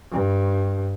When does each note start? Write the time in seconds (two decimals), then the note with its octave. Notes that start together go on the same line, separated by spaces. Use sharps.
0.12 G2